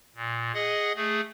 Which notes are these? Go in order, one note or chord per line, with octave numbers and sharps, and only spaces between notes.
A#2
G#4 D#5 F#5
A3 G#4